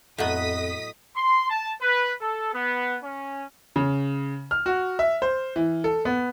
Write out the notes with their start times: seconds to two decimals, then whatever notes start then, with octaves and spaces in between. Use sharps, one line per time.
0.18 F2 A2 F#3 B3 D#5 D#6 B6
1.16 C6
1.50 A5
1.81 B4
2.21 A4
2.53 B3
3.03 C#4
3.76 C#3
4.51 F6
4.66 F#4
4.99 E5
5.22 C5
5.56 E3
5.84 A4
6.05 B3